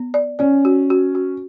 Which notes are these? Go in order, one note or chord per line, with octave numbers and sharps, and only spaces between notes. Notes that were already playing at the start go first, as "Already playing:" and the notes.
Already playing: B3
D5
C#4 D5
F#4
F#4
F#4